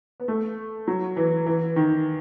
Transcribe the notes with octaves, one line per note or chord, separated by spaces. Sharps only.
B3
A3
F#3
E3
E3
D#3